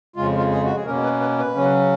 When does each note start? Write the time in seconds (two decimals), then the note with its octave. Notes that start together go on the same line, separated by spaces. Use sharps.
0.16 F2 C#3 G#3 F4
0.38 F4
0.51 G#4
0.65 F#4
0.75 G#4
0.86 B2 A#3 C#4 A#4
1.04 B4
1.21 B4
1.39 B4
1.55 C#3 F#3 C#4